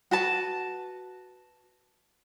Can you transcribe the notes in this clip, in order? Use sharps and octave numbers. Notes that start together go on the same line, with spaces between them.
F#4 B4 A5